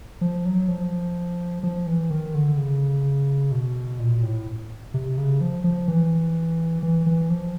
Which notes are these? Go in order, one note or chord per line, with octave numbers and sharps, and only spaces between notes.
F3
F#3
F3
F3
E3
D#3
D3
C#3
B2
A#2
A2
C3
C#3
F3
F3
E3
E3
E3
F3